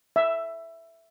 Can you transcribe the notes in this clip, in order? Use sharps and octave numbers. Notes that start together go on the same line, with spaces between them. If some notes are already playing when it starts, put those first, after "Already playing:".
E5